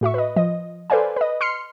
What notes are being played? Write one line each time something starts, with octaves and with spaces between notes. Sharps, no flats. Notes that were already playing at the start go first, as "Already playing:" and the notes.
A2 F#4 E5 C#6
B4 D#5
F3 D#5
A4 B4 C5 D5 F5 G#5
B4 D#5
C6 F6 C7 C#7